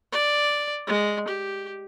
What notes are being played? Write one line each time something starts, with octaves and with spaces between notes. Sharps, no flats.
D5
G#3
G4